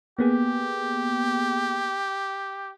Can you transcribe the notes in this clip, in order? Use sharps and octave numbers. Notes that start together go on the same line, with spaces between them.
A#3 B3 G4 G#4